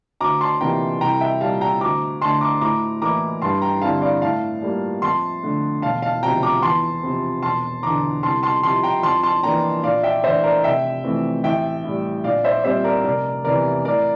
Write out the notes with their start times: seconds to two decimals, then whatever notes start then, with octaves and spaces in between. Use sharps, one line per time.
0.21 D2 A#5 D6
0.41 A5 C6
0.61 C3 E3 A#3 F4 G5 A#5
1.01 C2 G5 A#5
1.21 E5 G5
1.41 A#2 G3 F5 A5
1.61 G5 A#5
1.81 D2 A#5 D6
2.22 D3 A3 A5 C6
2.41 A#5 D6
2.61 A2 A#5 D6
3.02 E3 A#3 E4 A#5 D6
3.42 G2 A5 C6
3.62 G5 A#5
3.81 D3 G3 C4 E4 F5 A5
4.02 D5 F5
4.22 A2 F5 A5
4.62 G3 A#3 F4
5.02 F2 A5 C6
5.43 D3 A3
5.82 E1 F5 A5
6.02 F5 A5
6.23 D2 C3 F3 G5 A#5
6.43 A#5 D6
6.62 E2 A5 C6
7.03 C3 F3 C4
7.43 E1 A5 C6
7.83 E2 D3 A#5 D6
8.23 C2 A5 C6
8.43 A5 C6
8.63 C3 F3 A5 C6
8.83 G5 A#5
9.03 F2 A5 C6
9.23 A5 C6
9.43 E3 A#3 D4 G5 A#5
9.84 A#1 D5 F5
10.03 E5 G5
10.23 A2 E3 A3 D4 C5 E5
10.43 A#4 D5
10.64 F1 E5 G5
11.04 F2 E3 A3 C4
11.44 A1 E5 G5
11.84 A2 G3
12.24 A#1 D5 F5
12.45 C5 E5
12.64 A#2 G3 C4 C5 E5
12.84 A#4 D5
13.05 F1 A#4 D5
13.44 E2 C3 E3 A#4 D5
13.85 A2 A#4 D5